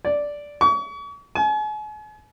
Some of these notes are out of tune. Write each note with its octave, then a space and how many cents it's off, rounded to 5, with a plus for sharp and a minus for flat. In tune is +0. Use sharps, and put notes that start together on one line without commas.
D5 -5
C#6 +40
G#5 +40